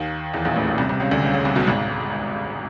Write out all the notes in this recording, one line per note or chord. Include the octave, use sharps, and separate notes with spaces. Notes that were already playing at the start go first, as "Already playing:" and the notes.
Already playing: D#2 D#3
E2 E3
A#1 A#2
A1 A2
A#1 A#2
C2 C3
C2 C3
C#2 C#3
D2 D3
C#2 C#3
C#2 C#3
C2 C3
B1 B2
G#1 G#2